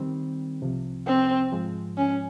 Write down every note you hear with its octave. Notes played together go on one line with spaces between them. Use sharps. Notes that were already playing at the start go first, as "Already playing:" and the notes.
Already playing: D#3 G3 C4
C2 C3 F3
C4
G#2 F3 G#3
C#4